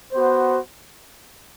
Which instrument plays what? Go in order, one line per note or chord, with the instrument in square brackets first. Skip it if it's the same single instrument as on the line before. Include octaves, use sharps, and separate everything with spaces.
[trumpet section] B3 F#4 C5